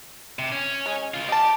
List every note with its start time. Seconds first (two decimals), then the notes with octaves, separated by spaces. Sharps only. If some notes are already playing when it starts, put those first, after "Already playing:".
0.39 C3
0.52 C#4
0.86 G#3
1.14 C#3 F4
1.29 G4 D#5 A5